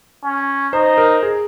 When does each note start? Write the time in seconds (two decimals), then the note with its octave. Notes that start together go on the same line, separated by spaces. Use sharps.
0.24 C#4
0.73 D#4 C5
0.98 A#4
1.23 G#4